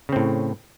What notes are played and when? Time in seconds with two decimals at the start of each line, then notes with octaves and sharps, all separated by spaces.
0.09 C#3
0.12 C4
0.16 A2